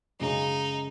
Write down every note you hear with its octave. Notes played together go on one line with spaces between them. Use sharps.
F#2 C#3 G#3 C#4 D#4